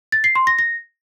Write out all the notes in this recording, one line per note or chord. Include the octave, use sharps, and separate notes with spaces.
A6
C7
C6
A#6
A#6